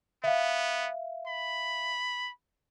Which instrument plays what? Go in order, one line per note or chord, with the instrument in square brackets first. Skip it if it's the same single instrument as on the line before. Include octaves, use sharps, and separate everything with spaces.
[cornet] B3 [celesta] E5 F5
[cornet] B5